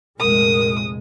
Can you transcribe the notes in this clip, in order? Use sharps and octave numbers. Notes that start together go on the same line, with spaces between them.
F1 A#1 G#3 A#4 D#6